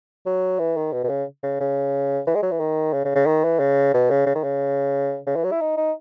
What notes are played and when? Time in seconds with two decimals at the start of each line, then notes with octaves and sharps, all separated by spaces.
0.26 F#3
0.59 E3
0.77 D#3
0.93 B2
1.04 B2
1.09 C#3
1.43 C#3
1.60 C#3
2.27 E3
2.35 G#3
2.43 F#3
2.51 E3
2.60 D#3
2.93 C#3
3.05 C#3
3.15 C#3
3.27 D#3
3.44 E3
3.60 C#3
3.94 B2
4.10 C#3
4.26 C#3
4.35 D#3
4.44 C#3
5.27 C#3
5.36 E3
5.44 F#3
5.51 E4
5.61 D#4
5.77 D#4